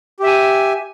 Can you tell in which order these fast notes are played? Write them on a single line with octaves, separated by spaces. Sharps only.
G4 E5 G#5